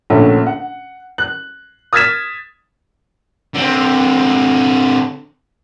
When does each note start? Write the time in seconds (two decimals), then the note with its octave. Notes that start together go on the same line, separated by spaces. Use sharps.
0.10 A#1 D3 A3 C#4
0.46 F#5
1.18 F#6
1.93 D#6 F6 G#6 A6 B6 E7
3.55 D3 C4